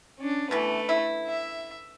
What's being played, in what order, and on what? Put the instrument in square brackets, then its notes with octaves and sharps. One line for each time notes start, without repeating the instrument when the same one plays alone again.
[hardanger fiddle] C#4 D4
[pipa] B2 E3 [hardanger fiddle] A3 B4
[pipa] E4
[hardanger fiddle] E5